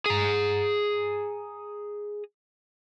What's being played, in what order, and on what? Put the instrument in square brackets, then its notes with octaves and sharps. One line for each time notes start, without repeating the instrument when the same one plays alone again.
[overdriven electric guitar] G#4 A#5